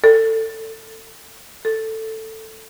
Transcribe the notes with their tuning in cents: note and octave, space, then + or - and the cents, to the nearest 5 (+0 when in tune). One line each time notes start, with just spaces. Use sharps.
A4 +25
A4 +10